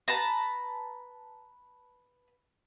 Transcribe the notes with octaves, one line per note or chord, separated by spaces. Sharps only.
B4 A5 A#5